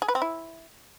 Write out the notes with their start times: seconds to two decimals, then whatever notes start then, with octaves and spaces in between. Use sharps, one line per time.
0.02 G#4
0.08 B4
0.15 C4
0.22 E4